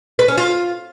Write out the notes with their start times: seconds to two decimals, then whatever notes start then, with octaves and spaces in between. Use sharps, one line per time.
0.19 B4
0.28 C#4
0.38 F4